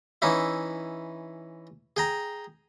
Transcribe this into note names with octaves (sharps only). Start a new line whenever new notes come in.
E3 C#4 D#4 E4
G#4 G5 A#5